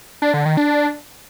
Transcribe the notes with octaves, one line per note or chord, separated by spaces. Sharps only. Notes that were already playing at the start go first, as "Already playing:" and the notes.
D4
D3
D#3
D4